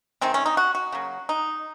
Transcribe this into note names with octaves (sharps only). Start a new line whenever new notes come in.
C3 D#3 G#3 C4
C#4
D#4
F#4
F#4
C#3 F#3 A#3
D#4